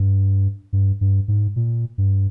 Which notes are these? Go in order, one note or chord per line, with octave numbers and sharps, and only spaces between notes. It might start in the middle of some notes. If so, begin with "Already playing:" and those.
Already playing: G2
G2
G2
G#2
A#2
G2